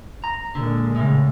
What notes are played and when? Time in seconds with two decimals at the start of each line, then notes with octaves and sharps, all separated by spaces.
0.24 A#5
0.55 A#2 D3 G#3
0.96 A2 C#3